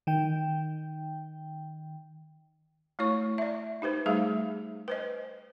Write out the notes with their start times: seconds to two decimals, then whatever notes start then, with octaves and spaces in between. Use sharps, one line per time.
0.07 D#3 G5
2.99 A3 E4 C#5 C#6
3.38 D5 E5
3.82 D#4 G4 B4 C5
4.06 G3 A3 D#4 G#4 E5 F5
4.88 B4 C5 D#5